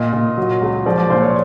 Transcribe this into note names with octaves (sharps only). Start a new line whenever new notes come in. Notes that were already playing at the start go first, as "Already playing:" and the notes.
Already playing: A#2 D#5
A#2
F#3
C#2
F3 D5
D5
A#2 C5
C#5